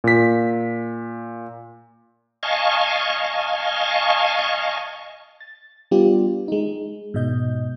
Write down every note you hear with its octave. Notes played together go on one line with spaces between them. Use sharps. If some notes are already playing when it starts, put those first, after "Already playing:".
A#2 B6
D#5 F5 G#5 A5 C#6
A6
G3 B3 D4 F4 G4
G#3 D#4
G#2 B2 D#5 G6